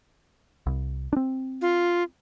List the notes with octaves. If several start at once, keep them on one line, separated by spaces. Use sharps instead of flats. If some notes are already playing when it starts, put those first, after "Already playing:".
C2
C4 D4
F4